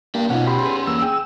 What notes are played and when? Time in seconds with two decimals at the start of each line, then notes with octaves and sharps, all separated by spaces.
0.15 A#3 D4 G4
0.30 B2 B3 C#4 D#4 F4 F#5
0.47 G4 B5 C6
0.63 G#4 B4
0.87 E2 A#3 E6
1.02 G#4 G5